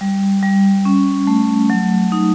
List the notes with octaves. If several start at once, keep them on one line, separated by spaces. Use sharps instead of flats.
G3
G3
C#4
A3
F#3
D#4